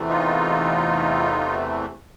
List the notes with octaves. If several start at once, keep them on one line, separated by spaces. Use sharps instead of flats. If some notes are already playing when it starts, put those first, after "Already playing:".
Already playing: E2 C3 E3 A3
D#4 F4